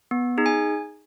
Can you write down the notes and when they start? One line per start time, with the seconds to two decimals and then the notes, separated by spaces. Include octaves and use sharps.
0.11 B3
0.38 D#4 G#4
0.46 G#5